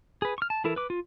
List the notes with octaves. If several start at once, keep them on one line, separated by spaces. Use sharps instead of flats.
G#4 B4
C#6 F6
A5
E3 E4 A4 A#4
B4 D6
F4